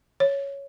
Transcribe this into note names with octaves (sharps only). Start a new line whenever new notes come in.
C#5